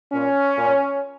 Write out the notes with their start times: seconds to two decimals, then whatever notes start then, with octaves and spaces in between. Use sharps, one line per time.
0.13 A#2 A#3 C#4
0.54 A#2 A#3